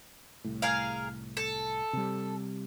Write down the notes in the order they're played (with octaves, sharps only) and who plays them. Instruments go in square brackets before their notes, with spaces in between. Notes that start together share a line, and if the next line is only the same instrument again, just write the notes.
[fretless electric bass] C2 A2
[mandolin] G#4 A#4 F5
A4
[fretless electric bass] C3 G3